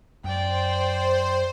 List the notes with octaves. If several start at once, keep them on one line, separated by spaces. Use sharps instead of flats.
F#2 C5 D5 G5